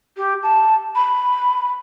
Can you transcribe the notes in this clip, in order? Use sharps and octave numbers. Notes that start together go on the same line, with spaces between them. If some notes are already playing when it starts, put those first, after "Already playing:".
G4
A5
B5